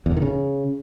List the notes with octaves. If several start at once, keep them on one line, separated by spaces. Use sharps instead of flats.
E2
A2
D#3
C#3